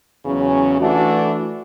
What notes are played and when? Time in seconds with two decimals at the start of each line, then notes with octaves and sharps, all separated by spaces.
0.23 E2 C#3 F#3 C#4
0.79 E3 A3 D4 F#4